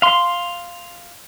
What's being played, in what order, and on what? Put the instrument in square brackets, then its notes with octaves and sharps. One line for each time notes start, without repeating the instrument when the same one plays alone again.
[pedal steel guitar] F5 C6